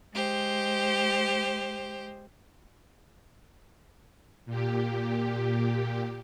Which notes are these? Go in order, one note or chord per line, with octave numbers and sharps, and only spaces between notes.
G#3 G4 C5
A#2 G4